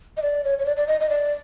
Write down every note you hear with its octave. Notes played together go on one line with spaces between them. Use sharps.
D#5
D5
C#5
C#5
D5
D5
D#5
D#5
D5